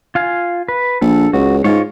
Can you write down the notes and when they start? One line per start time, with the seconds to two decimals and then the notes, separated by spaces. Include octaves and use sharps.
0.15 F4 F5 G#5
0.68 B4
1.01 A#1 A4
1.33 C#2 F#4
1.64 G#2 G#3 F4 C#5